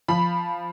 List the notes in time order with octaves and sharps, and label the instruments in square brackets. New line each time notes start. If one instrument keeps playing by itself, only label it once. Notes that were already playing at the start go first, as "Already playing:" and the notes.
[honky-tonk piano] F3 B5